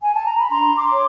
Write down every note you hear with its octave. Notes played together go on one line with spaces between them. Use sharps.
G#5
A5
A#5
B5
D4 A#5 C6
C6 D6
C#5